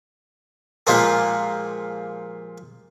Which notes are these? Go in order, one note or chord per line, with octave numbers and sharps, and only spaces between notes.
A#2 F3 G#3 A#3 F4 G4